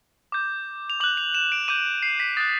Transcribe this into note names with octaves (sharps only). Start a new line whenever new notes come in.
D6 G6
F7
D6 F#6 F#7
F7
E7
D7
D6 G6 D#7
C7
B6
D#6 F#6 A6